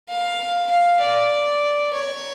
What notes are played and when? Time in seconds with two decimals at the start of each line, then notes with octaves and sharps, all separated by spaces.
0.10 F5
0.71 F5
1.02 D5
1.94 C#5